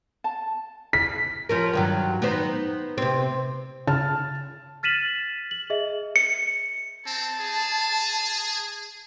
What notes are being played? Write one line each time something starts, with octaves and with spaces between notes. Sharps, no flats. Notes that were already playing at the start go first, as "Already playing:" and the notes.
A5
B6
F3 C#4 A#4
G2 D#3 F#3
B3 D#4 C5
C3 C4
C#3 A5 F6
F6 A6 B6 D#7 E7 F#7
F#7
G#4 D#5 E5
C#7
C4 A5
G#4